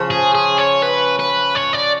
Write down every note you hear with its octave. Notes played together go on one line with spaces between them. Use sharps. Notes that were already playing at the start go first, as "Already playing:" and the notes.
Already playing: C#3 F3
G#4
G#4
C#5
B4
B4
C#5
D5